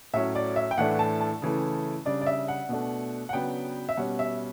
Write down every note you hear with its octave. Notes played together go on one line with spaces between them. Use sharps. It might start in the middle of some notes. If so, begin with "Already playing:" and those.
A2 F#3 C#4 E5
D5
E5
G5
A2 E3 A3 D4 F#5
A5
A5
C#3 E3 A3
C#3 G3 D4 D5
D5
E5
F#5
B2 A3 D4
F#5
C#3 F#3 B3 D4 G5
E5
B2 G3 C#4 F#5
E5